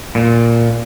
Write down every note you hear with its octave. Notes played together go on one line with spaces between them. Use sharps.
A#2